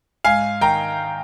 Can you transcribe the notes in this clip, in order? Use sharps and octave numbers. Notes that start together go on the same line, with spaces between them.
G#2 F5 G#5
D#3 G5 A#5